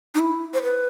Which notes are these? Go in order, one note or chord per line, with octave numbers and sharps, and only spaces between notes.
D#4
E4
C5
B4